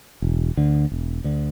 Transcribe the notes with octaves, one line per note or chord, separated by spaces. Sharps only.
E1
D2 D3
E1
D2 D3